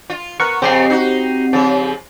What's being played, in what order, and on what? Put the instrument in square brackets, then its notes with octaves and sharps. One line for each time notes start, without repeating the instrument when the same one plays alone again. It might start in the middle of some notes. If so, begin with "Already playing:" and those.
[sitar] F4
[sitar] B3 [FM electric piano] A#4 F#5 C#6
[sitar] F2 C#3 [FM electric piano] C4 G4 C7
[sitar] D#4 F#4
C#3 F3